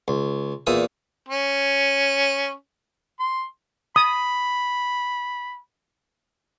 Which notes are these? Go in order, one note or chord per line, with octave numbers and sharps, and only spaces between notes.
C#2
E2 A#2 E5 D#6
C#4
C6
B5 D#6